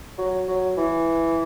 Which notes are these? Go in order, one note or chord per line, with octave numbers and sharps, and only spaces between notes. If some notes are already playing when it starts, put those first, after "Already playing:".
F#3
F#3
E3